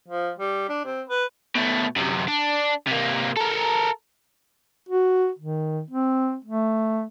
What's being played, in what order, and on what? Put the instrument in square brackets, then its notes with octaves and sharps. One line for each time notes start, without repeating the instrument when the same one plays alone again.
[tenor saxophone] F3
G3
D4
C4
B4
[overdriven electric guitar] B2 A3
F#2 C3
D4
C3 A#3
A4 A#4
[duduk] F#4
D#3
C4
A3